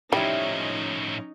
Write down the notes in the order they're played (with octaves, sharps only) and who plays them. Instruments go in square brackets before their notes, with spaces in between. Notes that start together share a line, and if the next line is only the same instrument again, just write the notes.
[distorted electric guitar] A2 F3 [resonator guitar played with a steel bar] C3 E4 E5 [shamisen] G3 [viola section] C#4 D#4